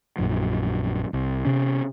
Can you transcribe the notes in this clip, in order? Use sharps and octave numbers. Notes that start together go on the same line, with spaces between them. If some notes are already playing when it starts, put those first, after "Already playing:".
A#1 F#2 F#3
C2
C3 C#4